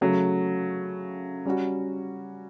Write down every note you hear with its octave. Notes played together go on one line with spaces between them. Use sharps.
C#3 F#3 A3
G3 C#4 F#4